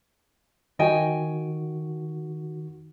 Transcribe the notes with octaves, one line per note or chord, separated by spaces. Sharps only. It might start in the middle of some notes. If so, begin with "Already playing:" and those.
D#3 F#4 D#5 G5 G#5